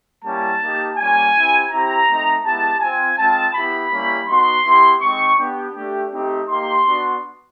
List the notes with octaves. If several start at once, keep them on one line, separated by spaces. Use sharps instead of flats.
G3 A#3 C#4 E4 G4 A5
A#3 D#4 G4
G3 A#3 C#4 F4 G#5
C4 E4 G4
C4 E4 G4 A#5
A3 C4 D#4
G#3 B3 E4 G4 A5
C4 F4 G#5
G#3 C4 F4 A5
B3 E4 G4 B5
G3 A#3 C#4 E4 G4
B3 D#4 F#4 C6
B3 E4 G4
G#3 C4 D#4 C#6
B3 D4 G4
A3 D4 G4
A3 C4 D#4 G4
A#3 D#4 G4 C6
B3 D4 F#4